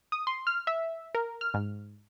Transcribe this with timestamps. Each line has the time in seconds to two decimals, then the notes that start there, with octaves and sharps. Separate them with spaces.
0.12 D#6
0.27 C6
0.47 F6
0.67 E5
1.15 A#4
1.41 F6
1.54 G#2